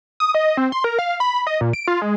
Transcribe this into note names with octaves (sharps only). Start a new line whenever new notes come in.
D#6
D#5
C4
C6
A#4
F5
B5
D#5
A#2
D7
F4
G#3